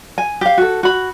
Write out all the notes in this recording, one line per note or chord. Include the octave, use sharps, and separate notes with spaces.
G#5
G4 F5
F#4 A4
F#4 B5